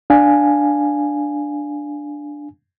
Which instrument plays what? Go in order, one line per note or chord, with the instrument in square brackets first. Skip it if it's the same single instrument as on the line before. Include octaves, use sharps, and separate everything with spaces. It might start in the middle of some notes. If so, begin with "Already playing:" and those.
[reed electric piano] D4 F5 G#5